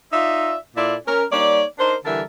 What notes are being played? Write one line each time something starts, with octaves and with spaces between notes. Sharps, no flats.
D#4 F4 D5 E5
A#2 E4 F4 A4 D5
C#4 A#4
G3 A#3 D#4 C#5 D5
D4 D#4 A#4 C5
D3 E3 G3 A4 A#4 E5